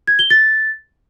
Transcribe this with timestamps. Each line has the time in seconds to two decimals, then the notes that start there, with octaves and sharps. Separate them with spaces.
0.08 G#6
0.19 G7
0.30 A6